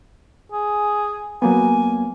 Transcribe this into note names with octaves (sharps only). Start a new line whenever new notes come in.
G#4
F#3 A#3 B3 G#5